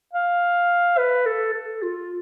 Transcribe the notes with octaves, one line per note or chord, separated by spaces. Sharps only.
F5
B4
A4
A4
F4